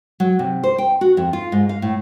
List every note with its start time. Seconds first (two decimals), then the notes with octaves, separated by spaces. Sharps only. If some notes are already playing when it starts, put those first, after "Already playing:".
0.20 F#3
0.39 C3
0.64 C5
0.78 G5
1.01 F#4
1.17 F2
1.33 F4
1.52 G#2
1.69 F5
1.82 A2